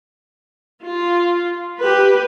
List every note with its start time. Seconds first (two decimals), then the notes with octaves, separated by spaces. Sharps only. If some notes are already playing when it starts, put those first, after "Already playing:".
0.82 F4
1.79 G4 B4